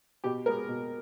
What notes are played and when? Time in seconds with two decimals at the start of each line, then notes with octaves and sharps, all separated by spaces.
0.24 B2 G4
0.46 G#3 B3 A#4
0.69 B2